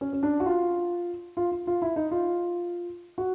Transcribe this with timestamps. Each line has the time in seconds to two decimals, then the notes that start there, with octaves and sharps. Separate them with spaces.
0.01 C#4
0.13 C#4
0.23 D4
0.40 F#4
0.46 F4
1.37 F4
1.52 F4
1.67 F4
1.82 E4
1.96 D#4
2.11 F4
3.18 F#4